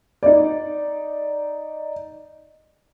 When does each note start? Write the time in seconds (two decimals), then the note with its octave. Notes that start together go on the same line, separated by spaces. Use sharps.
0.23 D#4 D5